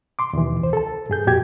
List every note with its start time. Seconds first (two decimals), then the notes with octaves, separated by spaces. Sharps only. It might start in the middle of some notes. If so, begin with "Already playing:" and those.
0.19 C6 D6
0.33 D#2 B2 E3
0.61 C2 C5
0.73 A4 A5
1.10 G2 G#4 G6
1.26 F2 A#2 F#4 G4 G#6